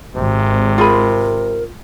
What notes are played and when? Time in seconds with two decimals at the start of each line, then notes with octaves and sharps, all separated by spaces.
0.15 G#1 C3
0.78 F4 G#4 A#4 B5